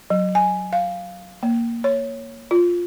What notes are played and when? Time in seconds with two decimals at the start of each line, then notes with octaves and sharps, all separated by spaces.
0.10 F#3
0.35 G#5
0.73 F5
1.43 A#3
1.84 C#5
2.51 F4